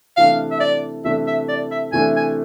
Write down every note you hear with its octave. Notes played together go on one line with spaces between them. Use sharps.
C3 E3 A3 D4 F5
E5
D5
C3 E3 A3 D4 E5
E5
D5
E5
C3 E3 A3 D4 G#5
G#5